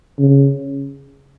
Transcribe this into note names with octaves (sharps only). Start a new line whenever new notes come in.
C#3